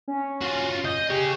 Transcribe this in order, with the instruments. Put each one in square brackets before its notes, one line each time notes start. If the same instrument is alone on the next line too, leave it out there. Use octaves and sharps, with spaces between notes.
[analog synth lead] C#4
[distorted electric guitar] F4 F#4
[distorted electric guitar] D#5 [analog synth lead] G6
[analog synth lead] G4 [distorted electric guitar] G#4 C#5